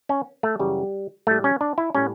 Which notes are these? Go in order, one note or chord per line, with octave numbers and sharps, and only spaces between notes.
C#4
A3
F#2 C#3 E3 G3
A2 G3 A3
C#4
D4
E4
A2 G3 C#4